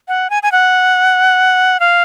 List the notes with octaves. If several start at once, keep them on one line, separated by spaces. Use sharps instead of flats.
F#5
G#5
G#5
F#5
F5